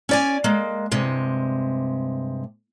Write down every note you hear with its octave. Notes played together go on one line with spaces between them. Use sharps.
C#4 D5 G#5
G#3 A#3
G2 C3 G#3